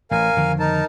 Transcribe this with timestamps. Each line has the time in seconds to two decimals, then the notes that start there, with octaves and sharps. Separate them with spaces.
0.11 A1 A#4 F5 G#5
0.37 F2 D3 D#3
0.59 D#4 A#4 A5